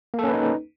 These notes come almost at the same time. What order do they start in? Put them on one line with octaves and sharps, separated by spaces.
A#3 A4 C#4 B4 D#4